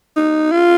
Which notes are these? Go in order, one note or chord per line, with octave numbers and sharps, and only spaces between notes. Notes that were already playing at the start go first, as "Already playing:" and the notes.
D#4
F4